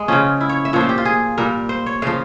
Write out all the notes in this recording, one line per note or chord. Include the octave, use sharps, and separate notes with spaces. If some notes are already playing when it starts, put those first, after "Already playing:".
Already playing: G#3
C#3 F3 C#4
E4
C#5
E5
A#2 F3 C#5
C5
G4
F4
G#4
A#2 G3 A#4
C5
C#5
C#3 F3 F5